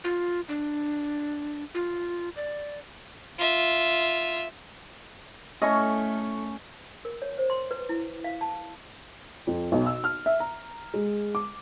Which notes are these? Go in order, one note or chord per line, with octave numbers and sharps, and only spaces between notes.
F4
D4
F4
D5
F4 E5
A3 C#4 E4 A4 D#5 C#6
A#4
C#5
C5
C6
B4
E4
F5
A5
F2
B1
E6
F6
E5
A#5
G#3
D6